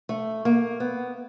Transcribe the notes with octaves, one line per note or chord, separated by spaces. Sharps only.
A3
A#3
B3